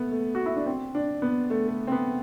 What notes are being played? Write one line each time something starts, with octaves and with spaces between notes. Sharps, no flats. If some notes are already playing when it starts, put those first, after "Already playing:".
Already playing: A3 B3
A3
F#4
E4
D4
C4
D4
B3
A3
A3
C4
B3